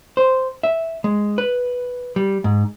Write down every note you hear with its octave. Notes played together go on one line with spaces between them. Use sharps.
C5
E5
G#3
B4
G3
G#2